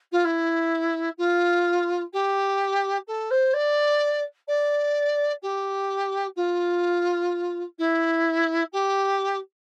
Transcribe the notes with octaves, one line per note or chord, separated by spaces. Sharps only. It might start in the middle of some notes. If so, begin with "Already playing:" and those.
F4
E4
F4
G4
A4
C5
D5
D5
G4
F4
E4
G4